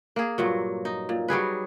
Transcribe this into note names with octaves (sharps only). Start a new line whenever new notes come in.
A#3 G#4
G2 A#2 F#3
D#4
A#2
F#3 G3 G#4 B4